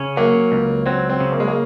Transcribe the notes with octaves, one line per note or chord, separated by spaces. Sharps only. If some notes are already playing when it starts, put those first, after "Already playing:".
Already playing: C#3 C#4
F#3 A#3
C#2
F#3 C4
C4
C#3
A#3
G#3
A#3